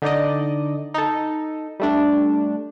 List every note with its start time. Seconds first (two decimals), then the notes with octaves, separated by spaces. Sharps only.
0.02 D3 D#4 D5 D#5
0.94 D#4 A4
1.80 G3 A3 D4